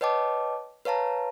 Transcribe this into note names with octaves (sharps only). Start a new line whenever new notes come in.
B4 C#5 D#5 G5 A5 D6
B4 C#5 F5 A5 A#5